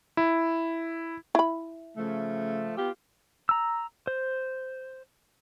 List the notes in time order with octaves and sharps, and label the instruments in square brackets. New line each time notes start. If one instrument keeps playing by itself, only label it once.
[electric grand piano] E4
[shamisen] E4 B5
[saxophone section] C#3 F3 A3
B3 F4 G4
[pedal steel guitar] A#5 E6
C5